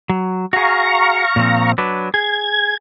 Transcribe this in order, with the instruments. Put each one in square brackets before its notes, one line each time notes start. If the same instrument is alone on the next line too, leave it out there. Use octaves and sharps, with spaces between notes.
[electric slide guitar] F#3
[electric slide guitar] F#4 G#4 [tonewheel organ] F5 A#5 C#6
[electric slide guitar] A#2 F3 C4
F#3 D4 B4
[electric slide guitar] G#4 [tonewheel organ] G#6